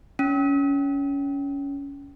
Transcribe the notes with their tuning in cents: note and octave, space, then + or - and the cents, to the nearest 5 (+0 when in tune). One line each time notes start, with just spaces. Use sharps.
C#4 +20